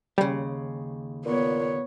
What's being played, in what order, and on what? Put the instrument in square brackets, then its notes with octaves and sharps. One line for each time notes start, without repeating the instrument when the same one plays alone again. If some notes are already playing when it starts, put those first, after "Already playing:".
[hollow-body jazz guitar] D#2 C#3 [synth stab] G3
[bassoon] A#2 [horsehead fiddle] B3 C#5